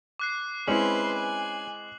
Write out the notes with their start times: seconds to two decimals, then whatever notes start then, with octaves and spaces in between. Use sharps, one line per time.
0.19 D6 F#6 C7
0.68 G#3 C4 C#4 E4 B4 C6 F#7
1.15 G#5